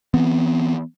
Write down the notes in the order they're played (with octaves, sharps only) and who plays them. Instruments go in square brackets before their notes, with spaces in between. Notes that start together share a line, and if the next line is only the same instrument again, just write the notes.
[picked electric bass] E3 B3 C4